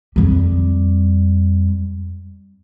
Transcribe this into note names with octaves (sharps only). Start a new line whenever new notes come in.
F2 G3